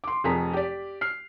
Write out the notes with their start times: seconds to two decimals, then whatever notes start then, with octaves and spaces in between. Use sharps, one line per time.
0.04 C6 D6
0.24 F1 F2 G#4 A#5 B6
0.53 G4 D5
1.01 F6 C7